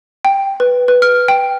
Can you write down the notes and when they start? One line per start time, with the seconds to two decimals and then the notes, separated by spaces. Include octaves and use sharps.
0.25 G5
0.60 B4
0.88 B4
1.02 F6
1.28 G5